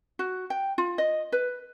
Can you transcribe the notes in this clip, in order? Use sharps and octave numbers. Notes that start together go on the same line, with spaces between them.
F#4
G5
F4
D#5
B4